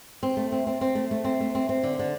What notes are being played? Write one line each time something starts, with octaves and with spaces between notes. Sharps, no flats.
C4
A3
C4
C4
C4
A3
A3
C4
A3
C4
C4
D3
D3